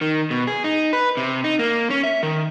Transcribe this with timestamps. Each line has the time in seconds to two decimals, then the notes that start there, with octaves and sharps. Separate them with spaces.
0.01 D#3
0.31 B2
0.47 G#4
0.64 D#4
0.93 B4
1.17 C3
1.44 D#4
1.59 A#3
1.90 C#4
2.03 E5
2.23 D#3